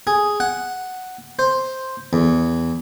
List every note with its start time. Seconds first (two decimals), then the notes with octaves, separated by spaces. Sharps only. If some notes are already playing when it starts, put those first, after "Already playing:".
0.07 G#4
0.40 F#5
1.39 C5
2.13 E2